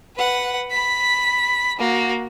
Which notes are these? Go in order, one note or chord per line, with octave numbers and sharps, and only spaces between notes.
B4 F#5
B5 B6
A#3 F#4